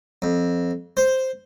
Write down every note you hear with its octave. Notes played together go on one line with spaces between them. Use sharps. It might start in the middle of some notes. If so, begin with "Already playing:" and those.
F2
C5